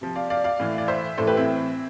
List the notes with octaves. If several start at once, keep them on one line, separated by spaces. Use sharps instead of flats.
C3 F3
D5 F5
D5 F5
D5 F5
A2 E3
D5
C5 E5
A2 E3 A4 C5
G4 B4
C4 E4